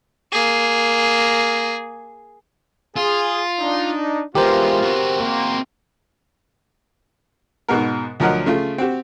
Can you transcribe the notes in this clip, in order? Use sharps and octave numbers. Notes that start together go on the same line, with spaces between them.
A#3 G#4
F4 G#4
D4 D#4
E3 G#3 B3 F4 G4 A#4 C5
C4 F#4
A#3
G#2 B2 B3 A#4
D2 F3 F#3 A#4 D#5 F#5
C#3 A3 F4
C4 F#4 G4